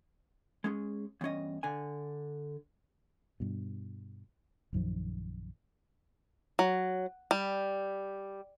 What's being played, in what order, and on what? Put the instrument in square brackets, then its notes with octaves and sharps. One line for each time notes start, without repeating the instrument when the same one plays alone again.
[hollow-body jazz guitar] G#3 C#4 G#4
E2 G2 C#4 D#5
D3 G#5
[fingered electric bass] G2 B2
A#1 F#2 D#3 F3
[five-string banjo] F#3
G3